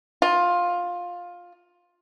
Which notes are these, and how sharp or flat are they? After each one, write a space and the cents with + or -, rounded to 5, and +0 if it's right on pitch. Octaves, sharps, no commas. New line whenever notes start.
F4 +15